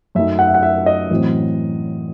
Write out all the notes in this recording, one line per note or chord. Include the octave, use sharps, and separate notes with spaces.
F#2 F#3 A3 D#4 E5
F#5
E5
F#5
E5
D#5
A1 A2 F#3 C4